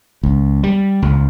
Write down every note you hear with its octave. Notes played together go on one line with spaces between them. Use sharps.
C#2
G3
C#2